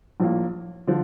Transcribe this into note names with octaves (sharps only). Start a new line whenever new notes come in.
A#1 A2 F3 A#3
D3 F3